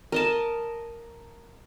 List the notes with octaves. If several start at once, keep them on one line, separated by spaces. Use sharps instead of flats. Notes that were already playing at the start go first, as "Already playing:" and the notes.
A#4 D#5 A5